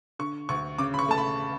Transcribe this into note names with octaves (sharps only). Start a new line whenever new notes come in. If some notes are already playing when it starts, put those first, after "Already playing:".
D3 C#6
D2 C#6
C#3 D6
B5
C#6
A3 A5
B5